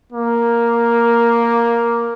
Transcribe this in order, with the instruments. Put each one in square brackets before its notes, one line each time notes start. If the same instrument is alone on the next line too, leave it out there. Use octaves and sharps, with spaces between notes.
[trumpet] A#3